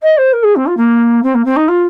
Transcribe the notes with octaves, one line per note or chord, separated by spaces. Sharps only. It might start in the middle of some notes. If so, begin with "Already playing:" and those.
D#5
C5
A#4
G#4
C4
F4
A#3
C4
A#3
C4
D#4
F4